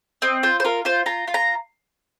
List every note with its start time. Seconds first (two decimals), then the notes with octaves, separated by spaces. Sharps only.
0.22 C4 D#5
0.43 F4 C5
0.60 C5
0.65 F4 A#4
0.85 F4 C5
1.06 F4 A#5
1.28 F4
1.34 A#5